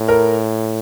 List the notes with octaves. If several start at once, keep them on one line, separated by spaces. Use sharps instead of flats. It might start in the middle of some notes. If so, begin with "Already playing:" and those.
Already playing: A2
A#4